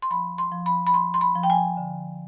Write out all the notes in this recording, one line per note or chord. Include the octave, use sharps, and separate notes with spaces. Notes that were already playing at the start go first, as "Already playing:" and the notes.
C6
F3 B5
C6
F3
B5
B5
F3 C6
C6
B5
F3
G5
G#5
D3